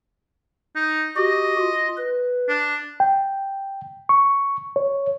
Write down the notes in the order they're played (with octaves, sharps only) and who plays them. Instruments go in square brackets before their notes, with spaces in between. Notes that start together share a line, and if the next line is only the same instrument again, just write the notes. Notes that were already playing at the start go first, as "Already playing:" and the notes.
[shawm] D#4
[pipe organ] F#4 G4 [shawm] D#5
[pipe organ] F4
B4
[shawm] D4
[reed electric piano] G5
C#6
C#5